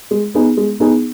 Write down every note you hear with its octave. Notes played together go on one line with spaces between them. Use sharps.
G#3
B3 D#4 G#4
G#3
B3 D#4 G#4